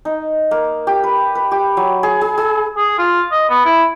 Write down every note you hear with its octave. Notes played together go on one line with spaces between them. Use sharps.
D#4
A#3
G4
B4
B4
G4
F#3
G#4
G#4
G#4
G#4
F4
D#5
B3
E4